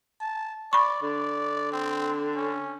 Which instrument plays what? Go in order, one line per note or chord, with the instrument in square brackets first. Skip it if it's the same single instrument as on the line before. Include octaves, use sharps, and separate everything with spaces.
[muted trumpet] A5
[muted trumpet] D5 [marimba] B5 C#6
[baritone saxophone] D3 [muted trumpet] D5
[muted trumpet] C4
C#4